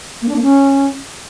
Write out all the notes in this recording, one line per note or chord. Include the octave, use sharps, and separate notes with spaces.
A#3
D4
A#3
C#4